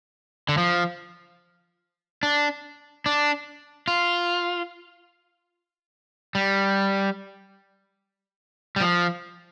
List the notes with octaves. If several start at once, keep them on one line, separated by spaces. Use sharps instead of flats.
D3
F3
D4
D4
F4
G3
G3
F3